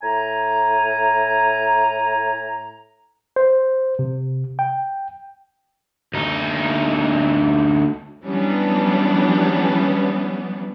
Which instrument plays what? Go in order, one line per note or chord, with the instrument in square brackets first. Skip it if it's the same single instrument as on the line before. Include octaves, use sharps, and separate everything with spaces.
[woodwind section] A2 G#5 A#5
[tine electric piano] C5
C3
G5
[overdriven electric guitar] D2 D#4
[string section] E3 F#3 G3 B3 C#4 D4